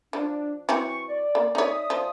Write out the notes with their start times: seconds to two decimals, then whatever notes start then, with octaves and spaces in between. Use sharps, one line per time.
0.13 F3 D4
0.69 E3 F#3 C4 C#6
1.08 D5
1.35 A#3
1.55 D#4 C#5 D5 E5 D#6
1.90 F3